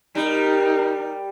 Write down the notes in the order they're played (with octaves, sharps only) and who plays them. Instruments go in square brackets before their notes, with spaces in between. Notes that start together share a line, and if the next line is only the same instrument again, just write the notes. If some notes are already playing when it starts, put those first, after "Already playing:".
[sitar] G3 [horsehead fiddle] D#4 A#4